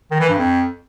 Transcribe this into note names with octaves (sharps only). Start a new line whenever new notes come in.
D#3
E3
G2
F2